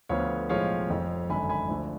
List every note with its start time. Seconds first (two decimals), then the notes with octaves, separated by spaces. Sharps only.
0.09 D2 D3 F3 B3 C#5 F5
0.49 B1 A2 F3 G#3 C#5 F5
0.90 F1 F2 F3
1.29 G#1 F#2 D3 G#5 B5
1.49 G#5 B5
1.69 D2 D3 F3 A3